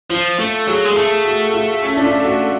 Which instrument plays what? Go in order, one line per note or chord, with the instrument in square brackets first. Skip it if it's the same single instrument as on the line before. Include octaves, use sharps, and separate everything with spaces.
[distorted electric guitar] F3 [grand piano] F4
[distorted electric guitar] A3 [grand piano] A4
[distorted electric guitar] F#3 [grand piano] G#4
[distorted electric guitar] G#3
[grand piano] G#4
[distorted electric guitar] A3 [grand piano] A4
[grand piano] F#4
F4
C#4
D4
F4
F#4